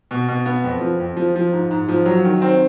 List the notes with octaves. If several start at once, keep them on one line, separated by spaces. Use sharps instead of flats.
B2
B2
B3
F2
F3
F2
F3
F3
G#2
G#2
F3
F#3
D#3
C4